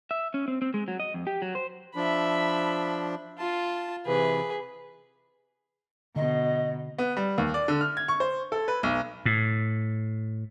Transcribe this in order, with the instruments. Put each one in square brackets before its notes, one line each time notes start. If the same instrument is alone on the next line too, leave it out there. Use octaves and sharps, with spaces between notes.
[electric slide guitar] E5
C#4
C4
C4
G#3
F#3
D#5
F2
G4
F#3
C5
[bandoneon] F3 D4 [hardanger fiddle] E5 B5
[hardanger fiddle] F4 [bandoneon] A5
[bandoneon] C3 E3 [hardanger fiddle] G#4 B4
[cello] B2 [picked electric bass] D3 [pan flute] D#5
[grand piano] B3
G3
D#2
D5
D3
F6
G#6
C#6
C5
A4
B4
B1
[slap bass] A2